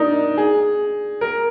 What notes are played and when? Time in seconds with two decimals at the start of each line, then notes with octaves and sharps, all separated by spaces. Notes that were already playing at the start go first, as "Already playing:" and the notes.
Already playing: D4 D#4 A#4
0.37 G#4
1.21 A#4